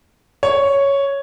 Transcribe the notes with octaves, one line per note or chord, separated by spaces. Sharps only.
C#5